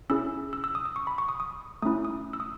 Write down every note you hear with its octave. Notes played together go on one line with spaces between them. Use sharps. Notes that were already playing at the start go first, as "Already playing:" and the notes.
C#4 E4 G#4 E6
E6
E6
D#6
D#6
C#6
B5
C#6
D#6
D#6
A3 C#4 E4 D#6
D#6
E6
D#6